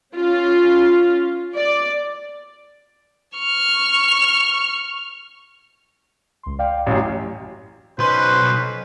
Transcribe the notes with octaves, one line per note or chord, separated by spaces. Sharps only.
C#4 F4
D5
C#6 F6
C#2 C6
D5 F5 G5
A1 F#2 C#4 G4 G#5
B1 C#4 D#4 B4 C5 C6